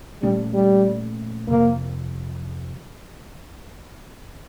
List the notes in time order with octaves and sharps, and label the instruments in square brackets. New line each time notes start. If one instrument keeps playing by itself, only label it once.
[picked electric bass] A#2 F3 A3 C#4 [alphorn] G3
[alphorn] G3
[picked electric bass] F2 C3 F3 [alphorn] A#3